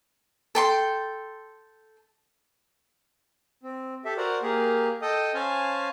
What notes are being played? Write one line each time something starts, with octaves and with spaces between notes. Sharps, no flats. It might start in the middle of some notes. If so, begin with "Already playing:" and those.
A4 G5 C6
C4
G4 A4 E5
F#4 A#4 C5 D5 F#5
A#3 G4 G#4 A#4
A4 D#5 G5 D#6
C#4 C5 F5 G#5 A5